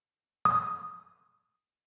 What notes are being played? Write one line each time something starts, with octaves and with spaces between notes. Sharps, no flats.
D#6